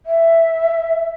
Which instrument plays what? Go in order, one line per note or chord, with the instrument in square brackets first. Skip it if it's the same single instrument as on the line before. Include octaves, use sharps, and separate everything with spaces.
[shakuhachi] E5